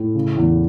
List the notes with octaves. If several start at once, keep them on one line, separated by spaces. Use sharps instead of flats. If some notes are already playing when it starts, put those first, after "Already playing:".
Already playing: A2
C#3
E2